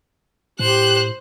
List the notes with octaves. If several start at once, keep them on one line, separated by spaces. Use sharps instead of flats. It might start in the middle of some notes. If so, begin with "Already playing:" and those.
A2 G4 C5 F#6